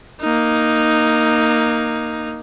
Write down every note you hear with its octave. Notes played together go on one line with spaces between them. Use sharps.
A#3 D#4